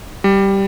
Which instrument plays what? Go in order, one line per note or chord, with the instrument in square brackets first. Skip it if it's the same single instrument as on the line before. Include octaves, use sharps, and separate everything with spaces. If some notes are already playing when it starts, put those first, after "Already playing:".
[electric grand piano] G3